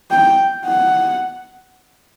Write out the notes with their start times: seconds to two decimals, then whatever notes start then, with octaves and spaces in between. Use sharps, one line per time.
0.11 G5
0.66 F#5